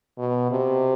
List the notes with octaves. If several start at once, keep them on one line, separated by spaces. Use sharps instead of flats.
B2
C3